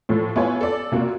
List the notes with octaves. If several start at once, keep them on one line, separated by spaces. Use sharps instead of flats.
A2 F3 A4
B3 E4 F4 C#5 G#5
A4 D5
C3 A#3 F4 F#4